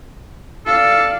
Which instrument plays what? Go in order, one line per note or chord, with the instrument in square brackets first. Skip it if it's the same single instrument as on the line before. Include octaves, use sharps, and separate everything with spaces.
[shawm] A4 [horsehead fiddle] D5 F5